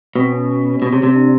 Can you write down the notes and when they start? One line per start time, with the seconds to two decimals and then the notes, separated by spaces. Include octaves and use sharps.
0.16 B2 C4
0.32 C#4
0.82 B2
0.93 C3
1.03 C3
1.14 D4